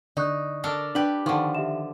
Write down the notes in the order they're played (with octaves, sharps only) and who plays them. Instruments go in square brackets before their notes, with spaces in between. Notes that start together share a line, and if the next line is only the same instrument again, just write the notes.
[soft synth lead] D3 [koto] D#4 [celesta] D5 C#6 F#6
[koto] D4 A4 A#4
[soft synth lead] D4 [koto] G4 B4 [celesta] F#7
[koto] D3 F3 [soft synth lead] D#3 [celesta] G5 C#6
[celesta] G4 E5 E7